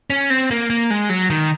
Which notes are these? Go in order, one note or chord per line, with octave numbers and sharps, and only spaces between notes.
C#4
C4
A#3
A#3
G#3
F#3
D#3